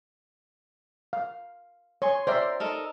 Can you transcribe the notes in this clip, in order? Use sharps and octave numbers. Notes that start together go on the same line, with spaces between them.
F5
C#5 G#5 C6 C#6
A#4 C5 D5 E5 G5 C6
D#4 A4 A#4